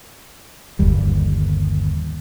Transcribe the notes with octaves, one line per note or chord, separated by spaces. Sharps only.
G1 D#2 G3